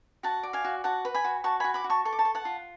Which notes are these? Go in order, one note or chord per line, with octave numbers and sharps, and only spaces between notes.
F#4 F#5 A5
D5
F5 G#5
F#4
F#4 F#5 A5
B4
G#5 B5
F#4
F#4 A5 C#6
F#4 G#5 B5
B5 D6
F#4
A5 C#6
A4 C#6
D6
A5 C#6
A4
F#5 A5
F4